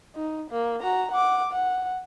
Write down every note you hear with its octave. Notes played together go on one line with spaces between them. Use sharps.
D#4
A#3
F#4 A#5
F#5 D6
F#5